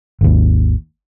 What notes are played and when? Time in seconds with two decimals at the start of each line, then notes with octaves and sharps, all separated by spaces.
0.21 G#1 D#2